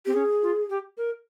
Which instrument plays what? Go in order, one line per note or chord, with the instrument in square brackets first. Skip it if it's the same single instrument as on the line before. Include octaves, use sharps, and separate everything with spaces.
[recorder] C4 [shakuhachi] G4
[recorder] C#4 [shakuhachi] G#4
[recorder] F4
G4
A#4